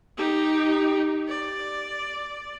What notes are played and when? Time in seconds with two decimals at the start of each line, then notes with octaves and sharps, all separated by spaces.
0.17 D#4 G4
1.28 D5